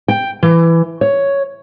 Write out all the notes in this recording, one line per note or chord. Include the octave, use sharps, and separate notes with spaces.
G5
E3
C#5